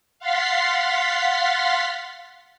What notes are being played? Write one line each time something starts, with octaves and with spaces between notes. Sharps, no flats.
F5 F#5 C6 A6 B6 C7